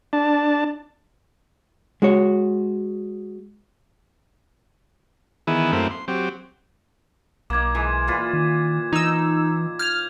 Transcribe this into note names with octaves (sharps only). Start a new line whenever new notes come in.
D4 A5
G#3 F#4 C#5
D#3 E3 B3 E4 G#4
F#2 A3 A#3 C4 E4
C6
F#3 C4 G4
B1 A#3 D#4 D6 G#6
E3 G#3
A#2 F4 B4
D#3
E3 D#4 E6
F6 G6 G#6 F7